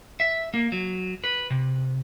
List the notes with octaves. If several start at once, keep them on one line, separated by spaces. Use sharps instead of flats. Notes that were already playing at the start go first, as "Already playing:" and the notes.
E5
A#3
F#3
B4
C3